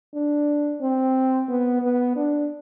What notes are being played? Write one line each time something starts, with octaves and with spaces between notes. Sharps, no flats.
D4
C4
B3
B3
D4